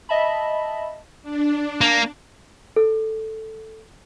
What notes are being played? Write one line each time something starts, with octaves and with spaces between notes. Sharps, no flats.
D#5 E5 A5 B5
D4
A#3
A4